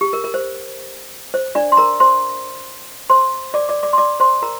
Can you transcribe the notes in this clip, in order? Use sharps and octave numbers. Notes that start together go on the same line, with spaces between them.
G4
A#4
A#4
C5
C5
D4 D5
C6
A#4 A#5
C5 C6
C5 C6
D5 D6
D5 D6
D5 D6
C6
D5 D6
C5 C6
A#4 A#5